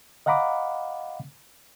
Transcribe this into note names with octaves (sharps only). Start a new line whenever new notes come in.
D#5 F5 F#5 A#5 B5 D6